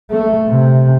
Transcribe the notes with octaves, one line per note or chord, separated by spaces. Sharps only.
A3
C3